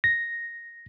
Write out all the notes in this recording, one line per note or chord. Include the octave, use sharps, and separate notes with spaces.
A#6